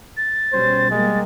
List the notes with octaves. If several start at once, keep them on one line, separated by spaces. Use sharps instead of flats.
A6
B2 G3 C#4 C5
G3 G#3 A#3